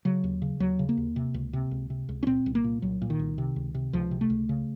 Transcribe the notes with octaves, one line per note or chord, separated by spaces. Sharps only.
C#3 F#3
D#2
C#3
D#2 F#3
C#3
A#3
D#2
C3
C#2
C3
C#2
C3
C#2
C#4
A#2 C4
C2
A#3
A#2
C2 F#3
A#2
D#3
C2
C3
C#2
C3
C#2 F3
C3
A3
C#2
C#3